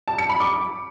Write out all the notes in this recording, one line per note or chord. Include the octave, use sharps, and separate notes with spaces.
A5
C#7
B5
D6